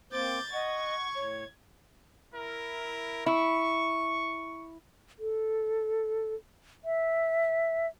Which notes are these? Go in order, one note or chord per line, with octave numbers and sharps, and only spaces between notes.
A#3 C4 C5 D6 G6 A6
D#5 F#5 C#6 G#6
A2 C#5
E4 A#4
E4 C#6
A4
E5